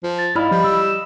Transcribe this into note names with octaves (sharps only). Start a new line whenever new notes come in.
F3
A6
G#2 E4 D#5 F5 B5
F3 G3
E6